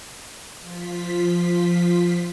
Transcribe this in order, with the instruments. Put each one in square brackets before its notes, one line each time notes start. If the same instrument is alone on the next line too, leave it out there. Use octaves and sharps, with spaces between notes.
[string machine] F3 F4 B6